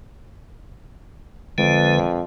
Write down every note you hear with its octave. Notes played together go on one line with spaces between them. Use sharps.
F2 D3 G#3 B4